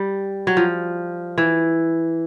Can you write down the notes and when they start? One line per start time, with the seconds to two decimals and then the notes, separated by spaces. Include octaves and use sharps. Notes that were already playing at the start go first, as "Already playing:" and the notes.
Already playing: G3
0.47 F#3
0.57 F3
1.38 E3